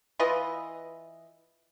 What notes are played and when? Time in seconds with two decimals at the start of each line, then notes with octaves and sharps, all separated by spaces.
0.19 E3 F4 B4 D#5